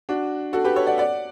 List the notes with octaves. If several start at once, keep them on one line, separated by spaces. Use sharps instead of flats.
D4 F#4
F#4 A4
G4 B4
A4 C#5
D5 F#5
D5 F#5